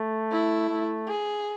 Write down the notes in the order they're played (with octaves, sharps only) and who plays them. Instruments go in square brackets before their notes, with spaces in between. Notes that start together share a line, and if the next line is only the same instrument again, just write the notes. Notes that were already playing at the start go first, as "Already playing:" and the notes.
Already playing: [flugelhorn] A3
[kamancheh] E4
[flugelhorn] A3
[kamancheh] G#4